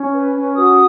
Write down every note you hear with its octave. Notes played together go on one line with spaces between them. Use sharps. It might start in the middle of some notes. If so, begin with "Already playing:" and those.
Already playing: C#4
B4
C#4
F#4 D#6